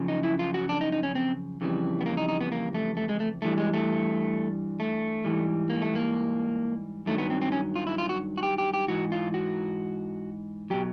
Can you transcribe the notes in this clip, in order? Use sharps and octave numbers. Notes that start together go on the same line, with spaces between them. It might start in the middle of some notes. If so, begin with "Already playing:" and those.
Already playing: F#2 C#3 F3
D#4
E4
F4
F#4
D4
D#4
D#4
C#4
C4
F2 C#3 E3 G3
B3
A#3
D#4
D#4
B3
A#3
A3
A3
G#3
A3
G2 E3 G3 A3
G#3
A3
A3
G#2 E3 G3
A#3
A3
A#3
G2 D#3 F#3 A3
B3
C4
C4
C#4
F4
E4
F4
F#4
F#4
G4
G4
G4
G#2 E3 F#4
F4
F#4
B2 F#3 G4